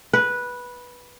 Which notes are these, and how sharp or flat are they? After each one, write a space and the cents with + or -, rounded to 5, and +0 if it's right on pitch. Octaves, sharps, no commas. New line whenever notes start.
B4 -10